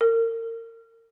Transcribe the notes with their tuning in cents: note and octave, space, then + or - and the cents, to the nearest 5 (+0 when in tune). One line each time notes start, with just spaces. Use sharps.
A#4 -35